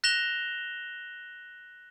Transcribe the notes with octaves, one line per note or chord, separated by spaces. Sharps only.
F#6 A#6 E7 F7 G7